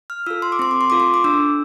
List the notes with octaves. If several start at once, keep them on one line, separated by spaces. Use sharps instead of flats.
F6
F4 A4 E6
C6
D6
C4 C6
D6
C6
F4 A4 D6
C6
D6
D4 E6